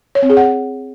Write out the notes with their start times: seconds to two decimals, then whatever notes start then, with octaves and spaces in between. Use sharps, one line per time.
0.15 C#5
0.22 C4
0.30 G#4
0.37 F#5